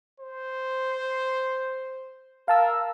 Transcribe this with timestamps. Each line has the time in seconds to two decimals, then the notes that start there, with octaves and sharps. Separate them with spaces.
0.20 C5
2.48 A#4 F5 A5 E6